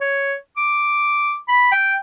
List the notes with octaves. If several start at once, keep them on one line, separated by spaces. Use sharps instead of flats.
C#5
D6
B5
G5